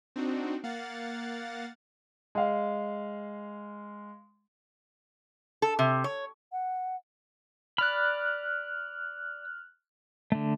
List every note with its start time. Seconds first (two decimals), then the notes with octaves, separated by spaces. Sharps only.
0.16 C4 D4 D#4 F#4
0.64 A#3 F5 F#5 A6
2.35 G#3 F5
5.62 A4
5.79 C3
6.04 C#5
6.52 F#5
7.78 D5 B5 F6 F#6
10.32 D3 A3